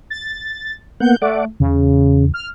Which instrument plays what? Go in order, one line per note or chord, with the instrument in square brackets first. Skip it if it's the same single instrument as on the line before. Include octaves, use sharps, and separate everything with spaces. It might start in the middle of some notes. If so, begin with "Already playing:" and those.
[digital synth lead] A6
[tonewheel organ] A#3 B3 F#5 [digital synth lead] G6
[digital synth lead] A3 [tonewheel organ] D5 F#5 D6
[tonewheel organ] E2 [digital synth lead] C#3
[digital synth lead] F6